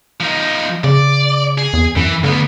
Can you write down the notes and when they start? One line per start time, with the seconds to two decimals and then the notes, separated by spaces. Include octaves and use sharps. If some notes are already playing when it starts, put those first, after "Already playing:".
0.20 F3 D#4
0.84 C#3 D5
1.58 G#4
1.73 E2
1.96 F#2 E3
2.24 D2 D3 B3